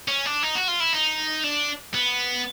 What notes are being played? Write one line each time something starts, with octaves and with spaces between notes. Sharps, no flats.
C#4
D4
D#4
F#4
F4
E4
D#4
D4
B3